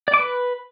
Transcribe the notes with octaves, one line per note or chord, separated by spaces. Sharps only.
D5
D6
B4